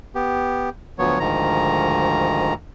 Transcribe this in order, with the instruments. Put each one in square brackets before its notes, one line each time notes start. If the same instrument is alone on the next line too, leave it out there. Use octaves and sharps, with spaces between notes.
[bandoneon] B3 G4
D2 F3 F#3 B3 C#5
D2 G#2 D#3 F3 A#5